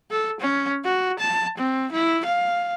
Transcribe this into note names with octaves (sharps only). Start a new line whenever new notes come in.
A4
C#4
F#4
A5
C4
E4
F5